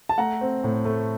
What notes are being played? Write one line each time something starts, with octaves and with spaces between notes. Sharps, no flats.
A5
A3 F#5 A#5
C4
A2
A3